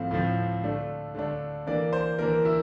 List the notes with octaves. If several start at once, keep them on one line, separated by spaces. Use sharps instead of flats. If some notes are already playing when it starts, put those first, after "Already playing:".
Already playing: A2 F3 C4 F5
A2 F3 C4
D3 A3 D4
D3 A3 D4
E3 A#3 D4 D5
C5
E3 A#3 D4 A#4
E4